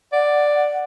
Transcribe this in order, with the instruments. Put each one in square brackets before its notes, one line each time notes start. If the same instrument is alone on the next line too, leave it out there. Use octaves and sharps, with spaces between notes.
[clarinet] D5 [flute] F#5